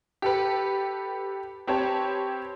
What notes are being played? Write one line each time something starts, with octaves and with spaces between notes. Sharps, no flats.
G4 A4 B4
C4 G4 B4 C#5 A5